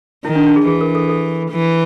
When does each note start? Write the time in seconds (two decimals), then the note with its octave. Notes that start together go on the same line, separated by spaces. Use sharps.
0.24 D#3 E4
0.35 D4
0.46 D4
0.56 G#4
0.66 E3 G#4
0.81 A#4
0.95 A4
1.09 A4
1.51 E3